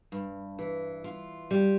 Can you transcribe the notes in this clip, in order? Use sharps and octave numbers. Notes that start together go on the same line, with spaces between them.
G2
E3
F4
G3